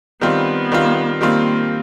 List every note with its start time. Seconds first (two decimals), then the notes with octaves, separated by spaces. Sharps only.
0.21 D#3 G3 B3 C4 F4
0.72 D#3 G3 C4 F4
1.21 D#3 G3 A#3 C4 F4